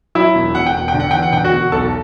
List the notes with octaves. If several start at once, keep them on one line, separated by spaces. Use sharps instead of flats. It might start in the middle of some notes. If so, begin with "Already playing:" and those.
F#3 E4 E5
E1
E1 F#5
G5
E1 F#5
G5
D3
F#5
E2 G5
F#5
D3 G5
F#4 F#5
E1
B1 A4 A5